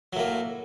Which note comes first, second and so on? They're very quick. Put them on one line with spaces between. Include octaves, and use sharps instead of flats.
F#3 A2 A#3